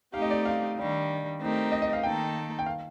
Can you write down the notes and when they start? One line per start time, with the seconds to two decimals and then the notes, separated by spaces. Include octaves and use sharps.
0.14 A3 C4 D#4 G4 F5
0.22 D#5
0.30 D5
0.45 F5
0.77 D#3 G3 D4
1.40 A3 C4 D#4 G4 A#4
1.72 D#5
1.82 D#5
1.93 F5
2.03 D#3 A#3 D#4 A4 G5
2.59 G5
2.66 F5